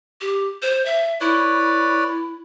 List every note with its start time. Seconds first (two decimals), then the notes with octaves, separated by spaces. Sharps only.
0.21 G4
0.62 C5
0.85 E5
1.21 E4 B4 C#5 D5